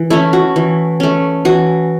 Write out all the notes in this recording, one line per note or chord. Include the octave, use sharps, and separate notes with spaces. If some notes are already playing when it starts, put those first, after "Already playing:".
Already playing: E3
A3 C#4 E4
F#4
E3
A3 C#4
E3 F#4